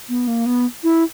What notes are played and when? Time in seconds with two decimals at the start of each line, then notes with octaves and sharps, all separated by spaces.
0.09 B3
0.27 A#3
0.46 B3
0.83 E4